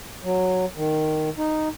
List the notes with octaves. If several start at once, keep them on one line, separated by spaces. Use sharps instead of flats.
F#3
D#3
D#4